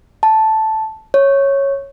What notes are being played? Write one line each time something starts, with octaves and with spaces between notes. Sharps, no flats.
A5
C#5